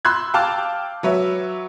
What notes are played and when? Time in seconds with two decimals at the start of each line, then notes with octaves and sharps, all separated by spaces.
0.05 B5 C6 E6 F#6 G#6
0.34 F5 G5 A5 D6 F6
1.03 F#3 B4 C#5 E5